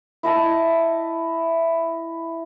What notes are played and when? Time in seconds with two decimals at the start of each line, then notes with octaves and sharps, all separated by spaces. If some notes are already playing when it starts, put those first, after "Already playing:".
0.23 E4 D#5 A5